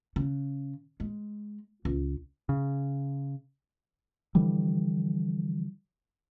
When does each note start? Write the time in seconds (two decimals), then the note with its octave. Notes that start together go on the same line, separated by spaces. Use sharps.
0.16 C#3
1.00 G#3
1.85 C#2
2.49 C#3
4.35 D3 E3 F3 G3